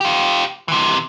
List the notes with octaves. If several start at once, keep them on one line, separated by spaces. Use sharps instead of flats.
F4 G4
C3 E3